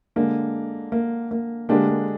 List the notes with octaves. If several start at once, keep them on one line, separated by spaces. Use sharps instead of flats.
D3 G#3 A#3 D4
A#3
A#3
D3 G#3 A#3 D4 G4
A#3